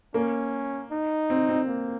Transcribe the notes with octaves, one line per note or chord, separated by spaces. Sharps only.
A#3 C#4
D#4
C4
C4
A#3